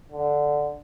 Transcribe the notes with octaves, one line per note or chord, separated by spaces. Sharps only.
D3